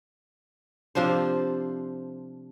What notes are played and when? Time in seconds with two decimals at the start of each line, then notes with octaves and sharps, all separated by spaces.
0.95 C3 F3 D4 C5